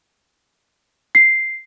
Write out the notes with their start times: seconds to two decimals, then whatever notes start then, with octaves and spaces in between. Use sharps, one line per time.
1.15 C7